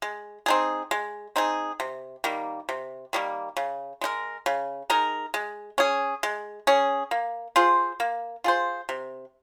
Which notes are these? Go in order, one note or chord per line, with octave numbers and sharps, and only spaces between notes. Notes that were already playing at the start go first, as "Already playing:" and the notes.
G#3
C4 D#4 G#4
G#3
C4 D#4 G#4
C3
D#3 G3 A#3
C3
D#3 G3 A#3
C#3
G#3 D#4 A#4
C#3
G#3 D#4 A#4
G#3
C#4 G#4
G#3
C#4 G#4
A#3
F4 G#4 C5
A#3
F4 G#4 C5
C3